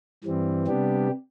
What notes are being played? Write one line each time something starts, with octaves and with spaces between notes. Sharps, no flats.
G2 E3 G3 C4
C3 G3 B3 D4 G4